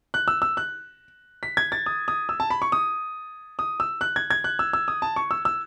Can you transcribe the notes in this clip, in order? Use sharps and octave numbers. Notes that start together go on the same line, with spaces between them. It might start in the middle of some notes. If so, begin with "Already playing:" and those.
F#6
E6
E6
F#6
B6
G#6
A6
D#6
D#6
E6
A5
B5
C#6
D#6
D#6
E6
F#6
G#6
G#6
F#6
E6
E6
D#6
A5
C#6
E6
E6